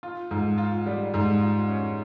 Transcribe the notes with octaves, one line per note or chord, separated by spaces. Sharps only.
F4
G#2
F4
G3
G#2
F4
C#4